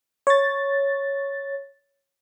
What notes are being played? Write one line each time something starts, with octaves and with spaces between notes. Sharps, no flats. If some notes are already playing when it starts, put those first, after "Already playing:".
C#5 A6